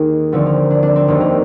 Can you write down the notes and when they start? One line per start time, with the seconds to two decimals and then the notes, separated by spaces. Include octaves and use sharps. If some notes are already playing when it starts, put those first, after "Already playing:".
Already playing: D#2 D#3 A#3 G#4
0.32 D2 D3 F3 C4
0.46 A#3
0.70 D4
0.83 D4
0.96 C4
1.08 F1 D#2 D3 A#3
1.20 A#3